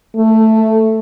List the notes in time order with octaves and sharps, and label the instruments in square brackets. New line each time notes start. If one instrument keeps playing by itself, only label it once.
[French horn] A3